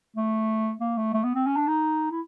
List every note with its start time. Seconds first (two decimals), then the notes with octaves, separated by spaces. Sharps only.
0.16 A3
0.80 A#3
0.97 A3
1.14 A3
1.24 B3
1.35 C4
1.46 C#4
1.56 D4
1.68 D#4
2.11 E4